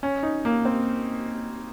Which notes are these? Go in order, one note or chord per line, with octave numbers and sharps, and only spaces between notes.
C#4
D#4
A#3
C4